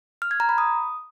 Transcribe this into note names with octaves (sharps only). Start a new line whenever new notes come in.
F6
G#6
A#5
B5
D#6